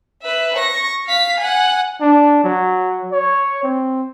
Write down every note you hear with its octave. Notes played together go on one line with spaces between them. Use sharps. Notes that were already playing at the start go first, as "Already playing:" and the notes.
B4 E5
C#6 A#6
F5 B6
F#5 G#5
D4
F#3
C#5
C4